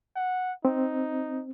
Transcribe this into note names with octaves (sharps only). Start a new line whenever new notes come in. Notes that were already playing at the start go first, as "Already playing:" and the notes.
F#5
C4 D#4